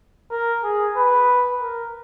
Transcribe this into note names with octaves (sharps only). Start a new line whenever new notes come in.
A#4
G#4
B4
A#4